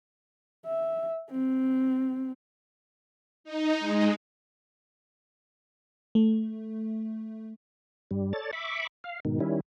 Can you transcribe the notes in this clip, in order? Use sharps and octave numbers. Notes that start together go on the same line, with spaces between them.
E5
C4
D#4
G#3
A3
G2 G3
A4 C#5 D5 A6
E5 B5 C#6 D6
F5
G#2 B2 D#3
D#3 G3 C#4 E4